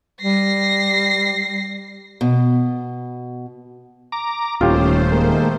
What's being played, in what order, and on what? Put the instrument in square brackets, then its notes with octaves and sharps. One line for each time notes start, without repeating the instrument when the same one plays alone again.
[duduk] G3 [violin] A#6 C7
[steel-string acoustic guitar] B2
[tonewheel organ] A#5 D6
[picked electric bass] D#1 [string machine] D#3 A3 C5 [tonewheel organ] C#4 [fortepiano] F4 G4
[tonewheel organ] G#3 A#3